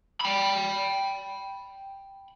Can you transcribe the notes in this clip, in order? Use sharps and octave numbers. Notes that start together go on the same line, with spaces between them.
G5 B5